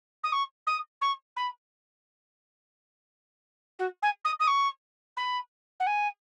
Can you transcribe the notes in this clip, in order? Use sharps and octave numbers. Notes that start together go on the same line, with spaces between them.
D#6
C#6
D#6
C#6
B5
F#4
G#5
D#6
D#6
C#6
B5
F#5
G#5